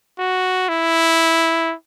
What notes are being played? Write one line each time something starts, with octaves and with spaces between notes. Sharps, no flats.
F#4
E4